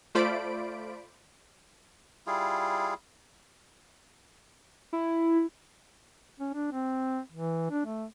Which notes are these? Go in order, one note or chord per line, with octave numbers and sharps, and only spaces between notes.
A3 F4 C5 D5 B5 D7
G3 E4 F4 G#4
E4
C#4
D4
C4
E3
D4
A3